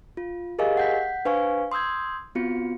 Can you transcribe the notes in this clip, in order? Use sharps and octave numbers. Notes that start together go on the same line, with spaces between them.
F4
G4 G#4 A#4 D#5 F5 G#5
F#5 G6 B6
D4 B4 C5 F5 G#5 C#6
C6 D#6 E6 G6 G#6
B3 C4 F4 F#4 C#7